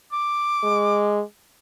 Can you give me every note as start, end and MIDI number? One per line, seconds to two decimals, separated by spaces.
0.13 1.23 86
0.63 1.22 56